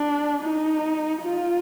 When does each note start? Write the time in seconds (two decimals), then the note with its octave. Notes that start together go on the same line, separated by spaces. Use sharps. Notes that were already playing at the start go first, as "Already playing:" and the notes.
Already playing: D4
0.43 D#4
1.21 F4